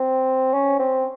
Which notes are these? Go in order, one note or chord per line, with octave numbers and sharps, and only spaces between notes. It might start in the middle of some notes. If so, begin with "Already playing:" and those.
Already playing: C4
C#4
C4